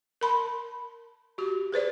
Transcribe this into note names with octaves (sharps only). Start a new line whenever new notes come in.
A#4 A5 B5 C6
F#4 G4
G#4 B4 C5 D5